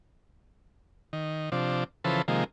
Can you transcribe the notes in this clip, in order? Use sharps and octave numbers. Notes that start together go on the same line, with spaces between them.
D#3
C3 F3 D4
C#3 E3 F3 A4 B4 C5
C3 D#3 F3 G#3 A#3